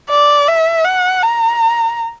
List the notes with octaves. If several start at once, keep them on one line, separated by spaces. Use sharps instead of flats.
D5
E5
F#5
A#5